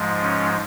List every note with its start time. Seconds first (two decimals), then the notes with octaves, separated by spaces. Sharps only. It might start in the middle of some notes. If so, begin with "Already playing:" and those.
Already playing: G#2 F3 G#3
0.22 C#4